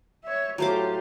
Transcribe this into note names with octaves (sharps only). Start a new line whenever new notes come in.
C#5 E5
A2 F#3 F4 G4 C5 D6